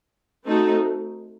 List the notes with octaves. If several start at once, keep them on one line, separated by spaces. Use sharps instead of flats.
A3 C4 D#4 F#4 A4